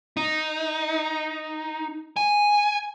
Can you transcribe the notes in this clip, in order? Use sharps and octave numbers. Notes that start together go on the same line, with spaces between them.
D#4
G#5